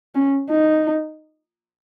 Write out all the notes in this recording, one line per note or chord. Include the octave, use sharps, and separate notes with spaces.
C#4
D#4